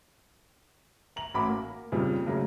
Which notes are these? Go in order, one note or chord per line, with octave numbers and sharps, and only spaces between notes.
A#5 F#7
A1 A2 F#4 B5 D6
A#3
F2 A#2 C#3 F3 G3
G#2 C#3 F#3 A3 A#3